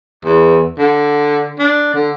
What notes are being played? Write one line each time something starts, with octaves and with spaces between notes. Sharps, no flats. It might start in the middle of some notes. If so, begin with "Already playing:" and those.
E2
D3
D4
D3